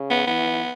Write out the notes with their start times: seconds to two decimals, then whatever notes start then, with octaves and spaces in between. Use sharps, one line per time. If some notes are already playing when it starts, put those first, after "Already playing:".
Already playing: C#3
0.11 B3
0.27 E3 B3